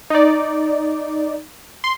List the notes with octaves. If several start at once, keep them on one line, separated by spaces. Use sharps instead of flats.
D#4 D5
C6